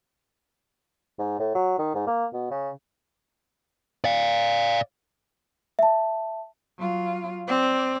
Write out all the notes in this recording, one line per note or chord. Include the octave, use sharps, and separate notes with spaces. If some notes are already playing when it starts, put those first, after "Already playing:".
G#2
A2
F#3
D#3
G#2
A#3
B2
C#3
D5 F5
E5 A5
F#3 F4
C4 D5